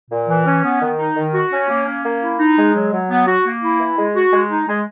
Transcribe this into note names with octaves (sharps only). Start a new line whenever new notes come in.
A#2
E3
C#4
B3
D#3
D#4
D#3
F#4
C#4
A#3
C#4
A#3
E4
D#4
G#3
F#3
F#3
B3
F#4
A#3
E4
E3
G#3
F#4
G#3
D#4
G#3